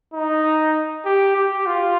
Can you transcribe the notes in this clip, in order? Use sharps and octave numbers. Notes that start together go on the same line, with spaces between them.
D#4
G4
G4
F4